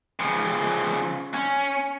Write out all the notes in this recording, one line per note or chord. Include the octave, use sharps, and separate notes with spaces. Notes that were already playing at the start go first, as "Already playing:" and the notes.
C#3 F3
C#4